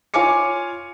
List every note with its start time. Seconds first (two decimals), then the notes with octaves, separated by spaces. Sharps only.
0.14 F4 C#5 F5 G#5 D6 C#7